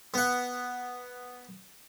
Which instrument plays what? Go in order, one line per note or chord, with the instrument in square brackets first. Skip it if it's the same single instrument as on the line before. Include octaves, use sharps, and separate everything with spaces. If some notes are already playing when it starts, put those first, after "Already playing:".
[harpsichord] B3 F#5